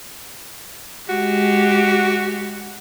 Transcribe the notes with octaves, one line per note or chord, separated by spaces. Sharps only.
G#3 F#4 G4